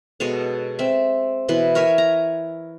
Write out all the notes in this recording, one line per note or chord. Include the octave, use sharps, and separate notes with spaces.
B2 G#3 A4 C#5
C4 E5
B2 E3 B4
A#4 C#5 E5 G#5
A#5